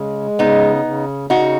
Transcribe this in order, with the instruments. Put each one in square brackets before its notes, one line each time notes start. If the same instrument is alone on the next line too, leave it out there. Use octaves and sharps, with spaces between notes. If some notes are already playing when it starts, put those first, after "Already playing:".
Already playing: [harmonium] C#3 G#3
[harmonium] C#3 [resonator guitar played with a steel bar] B3 D#4
[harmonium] C#3
[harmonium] C#3 [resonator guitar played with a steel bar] D#4 F#4